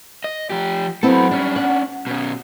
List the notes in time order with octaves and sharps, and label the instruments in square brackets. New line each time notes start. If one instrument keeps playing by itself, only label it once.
[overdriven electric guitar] D#5
F3 G4
[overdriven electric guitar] F#3 A4 [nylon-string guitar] B3 C4 E4
[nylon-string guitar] G3 [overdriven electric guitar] C#4 D4
[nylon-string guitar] F#5
[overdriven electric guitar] B2 C#4